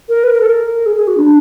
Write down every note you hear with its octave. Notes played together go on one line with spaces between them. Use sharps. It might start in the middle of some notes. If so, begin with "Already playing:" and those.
A#4
B4
A#4
A4
A#4
G#4
G#4
F#4
D4